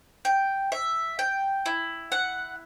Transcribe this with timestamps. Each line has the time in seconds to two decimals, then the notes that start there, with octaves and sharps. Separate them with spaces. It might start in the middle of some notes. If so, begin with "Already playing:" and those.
0.25 G5
0.72 E5
1.19 G5
1.66 E4
2.12 F#5